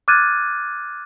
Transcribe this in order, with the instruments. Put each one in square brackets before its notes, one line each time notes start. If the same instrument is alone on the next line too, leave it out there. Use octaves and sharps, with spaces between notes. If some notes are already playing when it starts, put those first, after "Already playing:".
[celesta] D6 F6 F#6 G#6 A6 D#7